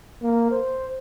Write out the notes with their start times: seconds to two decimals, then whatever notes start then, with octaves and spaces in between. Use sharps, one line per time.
0.22 A#3
0.52 C5